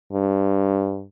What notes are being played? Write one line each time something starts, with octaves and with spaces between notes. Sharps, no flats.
G2